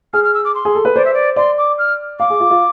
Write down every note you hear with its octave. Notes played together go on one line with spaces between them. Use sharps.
G#4 F6
F6
E6
D6
C6
G#4
A4
B4
C5 D5
E5
D5
D5 C6
D6
F6
F5 D6
G#4
F4
F4